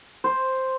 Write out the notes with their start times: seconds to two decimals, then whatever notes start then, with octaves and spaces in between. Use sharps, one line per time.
0.24 C5